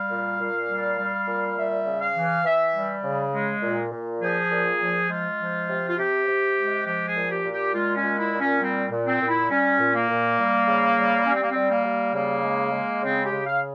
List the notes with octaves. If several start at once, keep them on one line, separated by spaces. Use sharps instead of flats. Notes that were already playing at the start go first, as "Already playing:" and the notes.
Already playing: G3 F5
A#2
A#2
G3
G3
A#2
G3 E5
C#3
F5
E3
E3 E5
G3
C#3
G#3
A#2
A#2
F3 G#4
A#2
F3
G#3 F4
F3
C3
F4
C3 G4
C3
G#3
F3 G4
G#4
A#2
G4
A#2
G4
G#3 F4
C#4
A#2
E4
A#2
C#4
G3 C4
A#2
C4
A#2
E4
G3 C#4
A#2
A#3
A#2
G3
C#3
G3
G3 C#4
C4
A#3
G3 C4
A#3
G3
C#3 A#3
G#3
G#3
C#3 C4
G4
C#3
F5